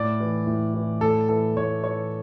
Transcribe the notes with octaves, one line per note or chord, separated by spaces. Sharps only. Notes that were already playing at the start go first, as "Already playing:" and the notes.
Already playing: A2 D5
E3
A2
E3
A2 A4
E3 A4
A2 C#5
E3 C#5